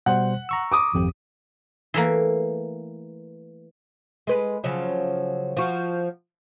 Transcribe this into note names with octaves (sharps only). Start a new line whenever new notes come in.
B2 G3 C5 F#5
A#5 C#6 E6
D6 D#6
G#1 F2 G4
E3 A3 A#3
G#3 B4
C#3 F3 F#3
F3 F#4